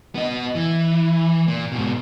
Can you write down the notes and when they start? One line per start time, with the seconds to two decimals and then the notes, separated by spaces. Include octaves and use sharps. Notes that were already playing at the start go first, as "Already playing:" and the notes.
0.15 B3 D#5
0.55 E3
1.48 A#2
1.72 G#2 B2